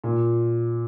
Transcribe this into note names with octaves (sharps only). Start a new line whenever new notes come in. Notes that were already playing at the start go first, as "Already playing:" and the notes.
A#2